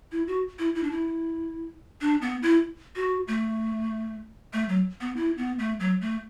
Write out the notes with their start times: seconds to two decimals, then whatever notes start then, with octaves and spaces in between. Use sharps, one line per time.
0.12 E4
0.27 F#4
0.59 E4
0.75 E4
0.83 D4
0.91 E4
2.01 D4
2.22 B3
2.42 E4
2.96 F#4
3.28 A3
4.53 A3
4.69 F#3
5.01 B3
5.16 E4
5.38 B3
5.59 A3
5.80 F#3
6.01 A3